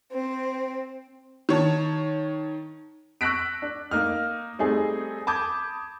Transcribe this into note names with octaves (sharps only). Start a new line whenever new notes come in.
C4
D#3 C#5 A5
C#6 E6 F#6 A#6 B6 D7
D4
A#3 D#4 F6
G3 A3 C4 D#4 G#4
A5 B5 D6 D#6 G6 G#6